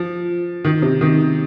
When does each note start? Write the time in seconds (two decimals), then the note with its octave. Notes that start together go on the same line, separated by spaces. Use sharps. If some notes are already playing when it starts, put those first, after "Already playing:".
Already playing: F3
0.65 D#3
0.82 C3
1.01 D#3